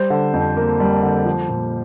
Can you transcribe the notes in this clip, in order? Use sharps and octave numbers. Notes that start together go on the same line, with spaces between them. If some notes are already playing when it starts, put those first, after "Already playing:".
Already playing: G3 C5
D3
F2
A#3
G3
D3
F3
A#2